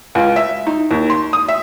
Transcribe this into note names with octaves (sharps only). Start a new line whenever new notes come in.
C#2
E5
D#4
D#2
C6
D#6
E5